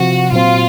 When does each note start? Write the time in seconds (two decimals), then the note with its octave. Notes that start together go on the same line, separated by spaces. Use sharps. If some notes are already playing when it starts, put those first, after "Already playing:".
Already playing: C3 F3 C4 F#4
0.31 A#2 F#3 C4 F4